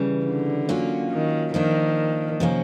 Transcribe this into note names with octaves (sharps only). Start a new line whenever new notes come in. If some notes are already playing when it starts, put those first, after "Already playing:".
Already playing: C#3 E3 G3
D3
F#3 A#3 C#4 F4
D#3
D#3 F3 A#3 D4
C3 F3 A#3 C#4